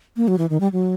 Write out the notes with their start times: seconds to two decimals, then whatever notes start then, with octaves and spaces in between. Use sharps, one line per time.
0.17 A#3
0.28 F#3
0.38 E3
0.50 D#3
0.60 G3
0.73 F#3